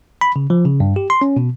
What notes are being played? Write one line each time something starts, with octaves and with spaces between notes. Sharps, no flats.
B5
C#3
F3
C#3
G2
G4
C6
C#4
B2